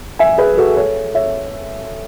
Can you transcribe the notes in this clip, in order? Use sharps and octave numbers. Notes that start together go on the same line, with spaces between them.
E5 G#5
G#4 B4
F#4 A4
A4 C#5
C#5 E5